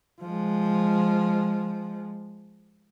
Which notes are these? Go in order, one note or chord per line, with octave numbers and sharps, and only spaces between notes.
F3 G#3